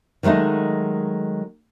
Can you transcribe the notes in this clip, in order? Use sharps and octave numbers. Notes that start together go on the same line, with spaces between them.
D#3 F#3 G#3 A3 D#4